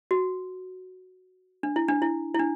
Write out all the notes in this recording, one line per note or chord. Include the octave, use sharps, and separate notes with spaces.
F#4
D4
E4
D4
E4
E4
D4